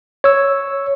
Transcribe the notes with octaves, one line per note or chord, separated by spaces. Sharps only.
C#5 E6